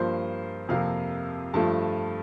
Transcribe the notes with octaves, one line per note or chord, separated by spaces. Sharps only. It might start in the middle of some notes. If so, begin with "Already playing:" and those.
Already playing: G2 F3 A#3 C5
F2 C3 F3 A#3 F5
G2 F3 A3 A5